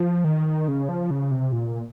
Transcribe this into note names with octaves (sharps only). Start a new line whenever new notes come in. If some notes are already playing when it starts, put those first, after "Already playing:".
Already playing: F3
D#3
C#3
F3
C#3
C3
A#2